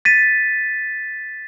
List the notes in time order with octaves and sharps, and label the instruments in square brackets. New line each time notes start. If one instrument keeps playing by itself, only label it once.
[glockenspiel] A6 B6 D#7